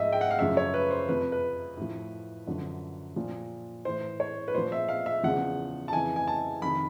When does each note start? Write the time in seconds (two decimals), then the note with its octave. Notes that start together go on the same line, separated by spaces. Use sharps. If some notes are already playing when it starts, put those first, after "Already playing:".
Already playing: G#2 F3 D#5 E5
0.12 G5
0.21 F#5
0.31 F5
0.39 F#2 C#3 F3 E5
0.57 C#5
0.74 B4
0.91 C5
1.09 F2 C3 F3 B4
1.32 B4
1.77 A2 F3
2.47 F#2 D3 F3
3.16 A#2 F3
3.85 A2 E3 C5
4.20 C#5
4.48 B4
4.54 A#2 F3 C5
4.72 E5
4.89 F5
5.06 E5
5.23 E2 C#3 F3 F#5
5.88 A5
5.92 F2 C#3 E3 G#5
6.16 G#5
6.28 A5
6.62 F2 C3 D#3 B5